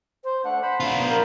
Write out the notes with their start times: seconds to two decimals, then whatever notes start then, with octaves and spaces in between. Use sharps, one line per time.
0.24 C5
0.44 A3 D4 F#5
0.63 C5 B5
0.80 D4 F4
0.94 B3
1.09 A#4